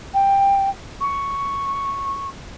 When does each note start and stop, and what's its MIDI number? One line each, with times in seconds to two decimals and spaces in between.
0.14 0.69 79
1.01 2.27 85